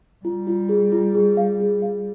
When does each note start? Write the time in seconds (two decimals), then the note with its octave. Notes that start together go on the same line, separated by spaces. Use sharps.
0.25 G3 F4
0.47 F4
0.69 G#4
0.92 F4
1.15 G#4
1.37 F5
1.60 G#4
1.82 F5